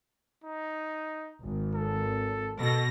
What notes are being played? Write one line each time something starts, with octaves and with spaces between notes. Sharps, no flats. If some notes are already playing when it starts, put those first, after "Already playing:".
D#4
G#1
A4
B2 A4 A#6